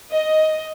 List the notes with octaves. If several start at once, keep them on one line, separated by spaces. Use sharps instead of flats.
D#5